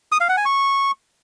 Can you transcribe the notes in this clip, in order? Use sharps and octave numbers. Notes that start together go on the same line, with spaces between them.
D#6
F5
F#5
G#5
C#6